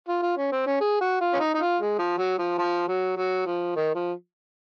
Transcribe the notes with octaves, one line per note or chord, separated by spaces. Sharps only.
F4
F4
C#4
C4
C#4
G#4
F#4
F4
C#4
D#4
D#4
F4
G#3
F3
F#3
F3
F3
F#3
F#3
F3
D#3
F3